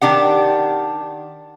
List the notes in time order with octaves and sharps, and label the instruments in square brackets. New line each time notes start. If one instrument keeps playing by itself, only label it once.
[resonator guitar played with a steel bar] D#3 D4 G4 F#5